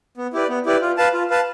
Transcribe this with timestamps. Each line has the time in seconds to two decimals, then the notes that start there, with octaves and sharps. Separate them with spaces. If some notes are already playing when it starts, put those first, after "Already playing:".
0.17 B3
0.33 E4 G4 B4 D5
0.49 B3
0.66 E4 G4 B4 D5
0.81 F4
0.97 B4 F5 A5
1.13 F4
1.30 B4 F5 A5